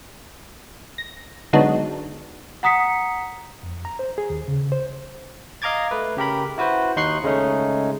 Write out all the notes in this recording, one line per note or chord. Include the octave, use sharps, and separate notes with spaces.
A#6
D3 F#3 G#3 B3 D4 D#4
F#5 A#5 D#6 B6 C#7
F2
A#5
C5
G#4
D#2
C#3
C5
D#5 F5 A#5 D6 G#6 A6
A3 B4
C#3 G4 A#4 B5
E4 F#4 B4 C5
D#2 D#4 C6 C#6 F#6 C7
C#3 G#3 A3 C#4 D#4